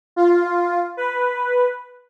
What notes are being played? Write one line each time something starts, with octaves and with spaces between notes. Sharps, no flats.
F4
B4